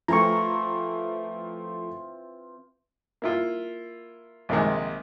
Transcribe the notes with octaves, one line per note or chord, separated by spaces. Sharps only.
E3 F3 A3 C4 F4 A#5 C#6
A#3 E4 F4
A#1 C3 D#3 G#3